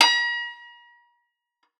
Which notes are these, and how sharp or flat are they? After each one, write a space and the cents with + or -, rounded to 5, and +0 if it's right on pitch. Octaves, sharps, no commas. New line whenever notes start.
A#5 +45